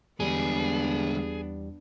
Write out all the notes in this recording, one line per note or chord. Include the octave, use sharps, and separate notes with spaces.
E2 D3 G3 G#3 B3 D4 G#4